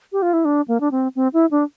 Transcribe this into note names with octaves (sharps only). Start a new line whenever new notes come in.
G4
F4
E4
D4
A#3
D4
C4
C4
E4
D4